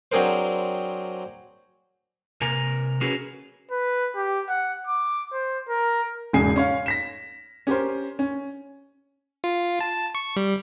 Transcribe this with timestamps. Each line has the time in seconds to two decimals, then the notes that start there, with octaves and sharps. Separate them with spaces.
0.12 F#3 C4 D4 G#4 A#4 C5
2.42 C3 A#4 G#5
3.01 C#4 F#4 G#4 A#4 B4
3.71 B4
4.15 G4
4.49 F#5
4.87 D6
5.33 C5
5.69 A#4
6.33 E1 E2 G#2 C#3 G#5 C7
6.56 C#4 C#5 F5
6.86 A#6 B6 E7
7.67 C#4 G4 A#4 C5
8.19 C#4
9.44 F4
9.80 A5
10.15 C#6
10.36 G3